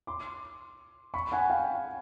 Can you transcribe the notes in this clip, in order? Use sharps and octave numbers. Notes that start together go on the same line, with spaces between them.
C6 D6
B5 C#6
F#5 G#5
F5 G5